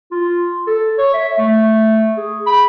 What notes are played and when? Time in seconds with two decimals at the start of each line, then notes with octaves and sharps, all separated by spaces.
0.12 F4
0.67 A4
0.98 C#5
1.14 E5
1.38 A3
2.17 G#4
2.46 B5